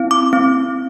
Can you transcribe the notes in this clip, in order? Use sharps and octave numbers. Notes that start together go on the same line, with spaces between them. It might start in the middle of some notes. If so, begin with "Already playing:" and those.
Already playing: C4 E4
D6
C4